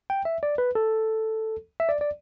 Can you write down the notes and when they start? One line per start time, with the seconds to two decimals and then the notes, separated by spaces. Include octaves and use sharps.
0.10 G5
0.25 E5
0.43 D5
0.58 B4
0.75 A4
1.80 E5
1.89 D5
2.01 D5